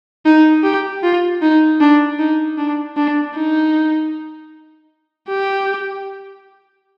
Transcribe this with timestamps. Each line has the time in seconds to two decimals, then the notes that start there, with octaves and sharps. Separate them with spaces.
0.25 D#4
0.63 G4
1.03 F4
1.42 D#4
1.81 D4
2.19 D#4
2.58 D4
2.97 D4
3.36 D#4
5.29 G4